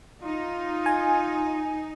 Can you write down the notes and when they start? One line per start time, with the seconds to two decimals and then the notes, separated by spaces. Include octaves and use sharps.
0.23 D#4 F4
0.86 G#5